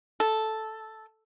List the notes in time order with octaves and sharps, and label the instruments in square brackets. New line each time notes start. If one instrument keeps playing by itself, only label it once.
[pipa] A4